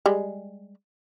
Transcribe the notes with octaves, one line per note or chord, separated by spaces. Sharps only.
G3 G#3